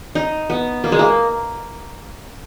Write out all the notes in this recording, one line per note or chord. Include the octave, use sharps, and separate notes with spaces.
D#4
B3
A#3
G#3
A#3